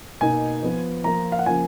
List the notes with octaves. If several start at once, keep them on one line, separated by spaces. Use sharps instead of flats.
B2 A#3 D#4 G#5
F3 B3 F4
F3 A#3 F4 A#5
F5
F#5
C#3 F3 A#3 G#5